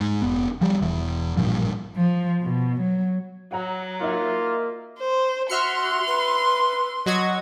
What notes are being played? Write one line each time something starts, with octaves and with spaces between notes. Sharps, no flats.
G#2
F1 B3
F3 G3
E1 E3
A1 G2 A#2 F3
F3
B2
F#3
F#3 F#5 A#5
A#3 D#4 F4 D#5 E5
C5
F#4 E5 C6 F6 C#7
B4
F#3 F#4 D#5 G#6